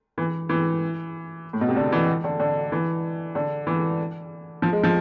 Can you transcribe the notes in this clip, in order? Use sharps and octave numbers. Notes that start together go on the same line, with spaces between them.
E3
E3
A2
B2
C3
D3
E3
D3
D3
E3
D3
E3
F3
G#3
F3